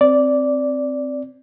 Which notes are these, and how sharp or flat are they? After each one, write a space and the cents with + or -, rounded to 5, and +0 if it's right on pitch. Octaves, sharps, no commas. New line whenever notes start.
C4 +0 D5 -10